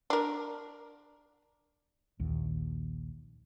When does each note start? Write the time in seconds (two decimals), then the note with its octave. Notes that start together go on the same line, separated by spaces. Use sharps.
0.10 D4 A#4
2.19 A#1 D#2